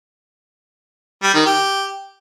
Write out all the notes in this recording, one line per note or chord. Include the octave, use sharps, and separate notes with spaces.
G3
D#3
G4